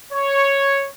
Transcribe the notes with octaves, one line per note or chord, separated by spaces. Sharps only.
C#5